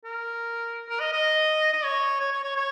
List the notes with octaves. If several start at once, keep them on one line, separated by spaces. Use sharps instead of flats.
A#4
A#4
D#5
D#5
D#5
C#5
C#5
C#5
C#5
C#5